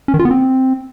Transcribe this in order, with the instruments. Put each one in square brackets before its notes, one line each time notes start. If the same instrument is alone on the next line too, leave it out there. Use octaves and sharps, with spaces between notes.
[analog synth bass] C#4
D#3
F4
B3
C4